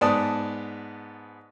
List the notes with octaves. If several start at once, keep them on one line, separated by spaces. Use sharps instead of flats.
G#2 B3 D5 A5 D#6